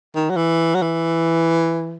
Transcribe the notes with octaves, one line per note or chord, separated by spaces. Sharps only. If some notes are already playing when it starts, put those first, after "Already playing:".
D#3
F#3
E3
F#3
E3